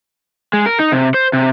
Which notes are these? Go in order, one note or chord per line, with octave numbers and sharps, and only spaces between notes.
G#3
A#4
D#4
C3
C5
C3